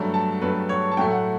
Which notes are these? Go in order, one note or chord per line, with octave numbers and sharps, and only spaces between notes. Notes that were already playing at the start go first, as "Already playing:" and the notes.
Already playing: G2 F#3 A3
A5
G2 F#3 A3 B4
C#5
A5
A2 F#3 A3 G5
F#5